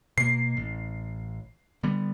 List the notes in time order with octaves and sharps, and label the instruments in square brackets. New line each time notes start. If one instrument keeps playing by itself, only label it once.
[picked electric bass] B2 A#3 [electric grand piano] C7
[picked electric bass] A1
D3 G3 B3